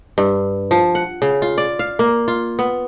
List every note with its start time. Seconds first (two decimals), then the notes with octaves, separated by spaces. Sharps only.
0.18 G2
0.71 F3
0.95 F#5
1.22 C#3
1.42 F4
1.58 D5
1.79 F5
1.99 A#3
2.28 F4
2.59 B3